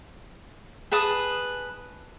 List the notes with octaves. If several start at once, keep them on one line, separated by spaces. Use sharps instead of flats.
G#4 B4 A5 D#6